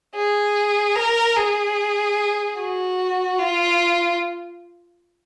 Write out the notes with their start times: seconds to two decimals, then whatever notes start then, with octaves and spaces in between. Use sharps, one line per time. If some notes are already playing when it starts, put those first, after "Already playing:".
0.16 G#4
0.96 A#4
1.37 G#4
2.57 F#4
3.39 F4